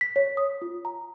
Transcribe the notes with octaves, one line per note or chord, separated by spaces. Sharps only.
B6
C#5
D#6
F4
A#5